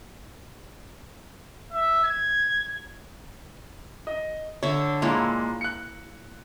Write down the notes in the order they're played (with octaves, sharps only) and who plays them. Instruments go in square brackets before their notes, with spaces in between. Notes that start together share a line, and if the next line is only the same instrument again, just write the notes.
[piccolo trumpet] E5
G#6
[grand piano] D#5
[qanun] D3 E5 [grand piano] C#5
[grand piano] A#2 G#3 [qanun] A#3 E4 C#5
[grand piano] F#6 C#7